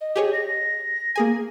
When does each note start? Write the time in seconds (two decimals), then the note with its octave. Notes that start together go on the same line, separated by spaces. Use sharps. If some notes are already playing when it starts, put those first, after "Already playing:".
0.01 D#5
0.16 G4 G#4 C#5
0.33 A#6
1.16 A#3 G#4 G#5